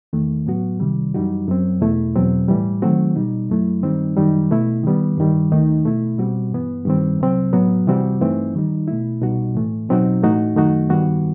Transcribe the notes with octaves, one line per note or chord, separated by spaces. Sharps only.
E2 D#3 A3
A2 F#3 B3 F#4
C2 C3 D#3 G3
F#2 E3 G3 D#4 F#4
F#2 F#3 C4
E2 B2 A3 E4
E2 B2 F#3 C4
A2 E3 G3
D#3 F#3 A3 C4 F#4
B2 G3 D#4
F#2 F#3 A3 E4
G2 D#3 G3 C4 D#4
F#2 D#3 G3 D#4
B2 A3 E4
D#3 G3 B3
G2 D#3 G3
D#2 D#3 A3 D#4
B2 A3 E4
B2 G3 C4 F#4
G2 E3 B3
G2 D#3 G3 C4
C2 C3 F#3 C4
A2 F#3 B3 F#4
C3 E3 G3 C4 F#4
G2 E3 A3 C4 D#4
D#3 G3 D#4
B2 A3 E4
C2 B2 G3 D#4 F#4
A2 E3 A3
B2 F#3 C4 D#4 F#4
A2 E3 A3 D#4 F#4
F#2 D#3 A3 D#4 F#4
G2 D#3 G3 B3 F#4